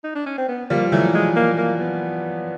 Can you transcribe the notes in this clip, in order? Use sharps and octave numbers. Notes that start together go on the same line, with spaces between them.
D#4
D4
C#4
C4
B3
F3 G3 A#3
E3 F#3 A3
G#3
A#3
A#3
B3